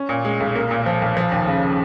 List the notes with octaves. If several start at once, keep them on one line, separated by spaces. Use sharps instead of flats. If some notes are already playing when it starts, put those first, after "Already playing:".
Already playing: C#4
A#2
G#3
B1
A#3
A#2
F3
B1
F3
D#2
C#3